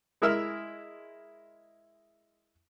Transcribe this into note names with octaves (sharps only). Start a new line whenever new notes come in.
G#3 E4 A#4 E5 E6 F6